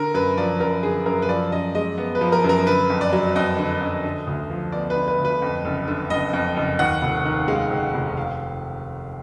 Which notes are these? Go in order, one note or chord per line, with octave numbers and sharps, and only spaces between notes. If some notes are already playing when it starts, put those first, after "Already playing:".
Already playing: D3 A#4
F#2 B4
F3 D5
F#2 A#4
D3 G#4
F#2 A#4
B4
F3 D5
F#2 D#5
G#3 D#5
B3
B4
F3
A#4
F#2
A#4
D3 B4
F2
D5
F#3
F2 D#5
D3
F2
D3
D2
F3
B3 D5
B4
D3
B4
D2
B4
F2
F#1
D3
F#1 D#5
F2
F#1
D#2 F#5
F1
D#3
G#3 F5
D#2
F1
F5